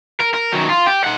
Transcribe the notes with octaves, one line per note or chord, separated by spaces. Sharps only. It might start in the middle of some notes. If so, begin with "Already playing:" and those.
A#4
A#4
D#3 F#3
F4
G4
D#4 F#5